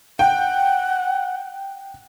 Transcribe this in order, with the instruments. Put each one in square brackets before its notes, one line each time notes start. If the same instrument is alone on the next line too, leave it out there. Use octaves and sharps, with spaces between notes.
[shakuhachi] F#5 [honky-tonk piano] G5